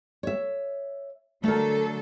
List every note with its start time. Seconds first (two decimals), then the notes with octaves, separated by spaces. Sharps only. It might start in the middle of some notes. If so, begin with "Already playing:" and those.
0.23 C#5 E5
1.44 D3 F#3 A3 A4 A#4